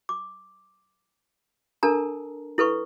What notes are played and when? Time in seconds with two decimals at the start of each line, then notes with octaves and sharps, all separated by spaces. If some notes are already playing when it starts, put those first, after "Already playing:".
0.09 D6
1.83 D4 A4 A#4 A5 A#5
2.58 E4 A4 B4 C#6